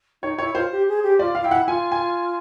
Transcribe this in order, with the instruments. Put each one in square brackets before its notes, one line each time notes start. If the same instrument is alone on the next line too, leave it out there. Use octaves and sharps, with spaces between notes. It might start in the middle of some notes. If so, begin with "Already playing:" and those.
[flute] D#4 [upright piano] C#5
[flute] E4 [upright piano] C#5
[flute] F4 [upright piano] C5
[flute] G4
G#4
G4
[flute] F4 [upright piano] D5
[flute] F4 [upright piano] F5
[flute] E4 [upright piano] G5
[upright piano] F#5
[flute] F4 [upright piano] G#5
[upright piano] G#5